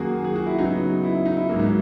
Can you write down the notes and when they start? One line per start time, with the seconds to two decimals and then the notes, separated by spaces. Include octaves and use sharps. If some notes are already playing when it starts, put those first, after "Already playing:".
Already playing: F#2 D#3 A#3 F#4 G#4
0.24 G#4
0.36 F#4
0.47 E4
0.58 C#3 F#3 B3 D#4
1.03 E4
1.15 E4
1.26 D#4
1.37 E4
1.49 G#2 F#3 A#3
1.59 D#4